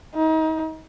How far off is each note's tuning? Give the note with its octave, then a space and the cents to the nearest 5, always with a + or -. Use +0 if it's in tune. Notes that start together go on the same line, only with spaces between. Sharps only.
D#4 +35